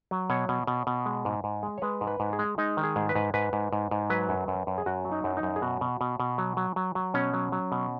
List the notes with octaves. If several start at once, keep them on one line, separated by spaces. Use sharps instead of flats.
F#3
B2 C#5
B2
B2
B2
G#3
G#2
G#2
G#3
C#5
G#3 B4
G#2
B4
G#2
G#4
G#3
G#3 D#4
D#3
G#4
G#2
B4
G#2
G#2 B4
G#2
G#2
G#2
F#3 B4
F#2
F#2
F#2
G#4
F#2 F#4
F#3
D#4
F#2
D#4
F#2
G#4
B2 F#4
B2
B2
B2
F#3
F#3
F#3
F#3
B2 C#4
F#3
F#3
B2